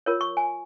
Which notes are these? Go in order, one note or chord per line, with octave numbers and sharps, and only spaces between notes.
F4 A#4 C#5
C#6
G#5